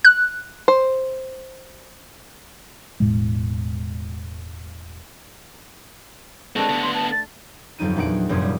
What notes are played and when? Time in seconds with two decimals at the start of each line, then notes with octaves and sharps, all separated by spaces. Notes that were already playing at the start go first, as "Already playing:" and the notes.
0.05 F#6
0.68 C5
3.00 E1 A2 G#3
6.56 G#3 A3 C4 D4 B4
6.69 D3 B3
6.83 C6
6.94 A5
7.12 A6
7.78 G1 F2 F#3 D#4 D#7
7.96 E2 A#2 D#4 F#5 D7
8.29 F1 F#2 A#2 F3 D#6 G#6
8.41 G3